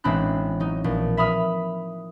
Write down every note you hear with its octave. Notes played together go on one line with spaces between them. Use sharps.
A1 G#3 C4 D4 B5 F#6
F#3 D#4
A#1
E5 B5 D#6 F6